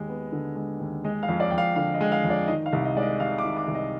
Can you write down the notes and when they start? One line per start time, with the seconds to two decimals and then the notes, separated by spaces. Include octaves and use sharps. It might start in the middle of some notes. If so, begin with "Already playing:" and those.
Already playing: D#2 G#3 D#5
0.08 B3
0.32 D3
0.56 G#3
0.80 D#2
1.04 G#3 D#5
1.23 F5
1.28 F2
1.40 D5
1.50 F2 G5
1.58 F5
1.76 D3 F5
1.94 D#5
2.01 G#3
2.12 F5
2.24 F2
2.30 D5
2.48 D#3 D#5
2.66 F5
2.73 C2
2.85 D#5
2.96 G#3 D5
3.03 D#5
3.20 C3 F5
3.39 D6
3.44 D#3
3.57 D6
3.68 C2
3.75 D#5